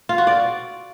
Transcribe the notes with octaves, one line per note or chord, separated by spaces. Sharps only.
F4
F#4
D5